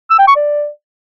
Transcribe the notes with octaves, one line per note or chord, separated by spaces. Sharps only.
E6
G5
C#6
D5